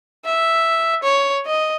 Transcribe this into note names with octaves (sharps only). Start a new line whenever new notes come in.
E5
C#5
D#5